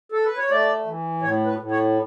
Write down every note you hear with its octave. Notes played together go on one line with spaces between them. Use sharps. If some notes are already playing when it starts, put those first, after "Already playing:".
A4
B4
C#5
A3 D5
E3
A2 C#5
B4
A2
C#5